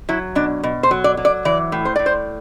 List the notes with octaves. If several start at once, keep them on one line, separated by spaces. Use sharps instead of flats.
F#3 E4
B2 D4
B2
C5
F#3
D5
F#3
D5
E3 D5
A2
C5
A2 D5
C5